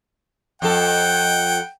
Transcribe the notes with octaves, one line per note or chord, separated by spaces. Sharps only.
F2 A4 F#5 G5